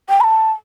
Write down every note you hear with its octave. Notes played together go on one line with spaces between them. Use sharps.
G5
B5
A5